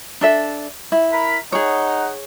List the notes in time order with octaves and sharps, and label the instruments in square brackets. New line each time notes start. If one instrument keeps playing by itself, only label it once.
[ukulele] D4 A4 E5
E4
[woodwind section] A#4 B5
[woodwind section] D#4 F#5 [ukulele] G#4 C#5